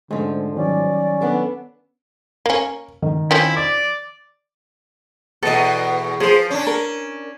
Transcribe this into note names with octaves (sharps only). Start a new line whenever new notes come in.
G#2 D3 F3 G#3 A3 C#4
D#3 F#3 G3 C#4 D5
B3 D4 A4
A#3 C#4 A#4
D#3
F3 C4 C#4 E4
D5 D6
E2 B2 A4 D#5
F3 G#4 C5
C#4 D4
A#4